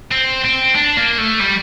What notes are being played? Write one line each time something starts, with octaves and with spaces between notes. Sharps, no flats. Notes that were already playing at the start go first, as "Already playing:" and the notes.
C4
C4
D4
A#3
A3
G3